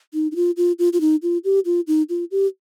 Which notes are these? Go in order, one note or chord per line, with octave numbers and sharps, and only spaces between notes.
D#4
D#4
F4
F4
F4
F4
D#4
F4
G4
F4
D#4
F4
G4